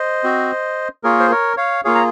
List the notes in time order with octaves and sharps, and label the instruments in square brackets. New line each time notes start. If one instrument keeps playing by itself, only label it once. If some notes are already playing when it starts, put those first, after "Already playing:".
Already playing: [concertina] C5 D#5
C4 F#4
A#3 F4 G#4 A#4 C#5
C5
A#4 C#5
C#5 F5
A#3 F4 G#4 C#5 F5
A#5